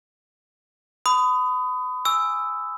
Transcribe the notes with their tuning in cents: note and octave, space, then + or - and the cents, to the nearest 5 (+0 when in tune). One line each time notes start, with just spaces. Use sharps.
B5 +35 D#6 +0
G#5 +0 C#6 +45 E6 +0